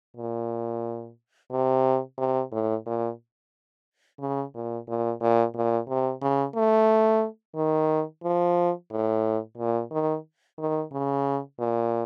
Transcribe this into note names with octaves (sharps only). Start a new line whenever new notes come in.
A#2
C3
C3
A2
A#2
C#3
A#2
A#2
A#2
A#2
C3
C#3
A3
D#3
F3
A2
A#2
D#3
D#3
C#3
A#2